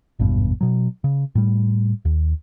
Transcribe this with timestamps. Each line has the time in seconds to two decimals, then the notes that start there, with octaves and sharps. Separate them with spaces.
0.19 G#1 E2 G2 B2
0.61 B2 F#3
1.04 C#3
1.35 A2 G3
2.05 D#2